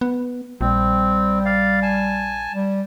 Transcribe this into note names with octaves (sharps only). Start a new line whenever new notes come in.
B3
A#1 G3 C4
D5 F5
G#5 A5
G3